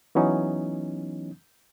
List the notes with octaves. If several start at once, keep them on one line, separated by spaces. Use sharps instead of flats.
E3 F#3 B3 C#4 D#4